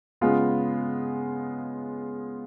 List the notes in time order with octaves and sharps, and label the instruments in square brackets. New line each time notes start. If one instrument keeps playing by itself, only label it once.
[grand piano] C#3 G#3 B3 F4